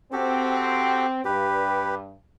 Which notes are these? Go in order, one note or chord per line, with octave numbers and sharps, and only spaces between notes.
C4 F#4 G4 A4
G2 G4 B4